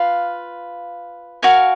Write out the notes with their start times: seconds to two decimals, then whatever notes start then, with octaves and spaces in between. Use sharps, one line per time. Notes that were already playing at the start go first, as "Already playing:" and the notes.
Already playing: F4 B4 F5
1.42 F#4 A#4 F5 G#5